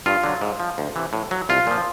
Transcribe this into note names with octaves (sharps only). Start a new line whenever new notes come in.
G2 F4
D3 F#3
G#2
F3
D2
C3 E3
A2
F#3
C2 F4
A#2 F3